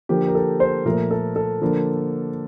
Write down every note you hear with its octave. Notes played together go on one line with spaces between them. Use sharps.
D3 F3 A#3 G4
A#4
A4
C5
A#2 F3 A3 A#4
A4
A4
D3 F3 A#3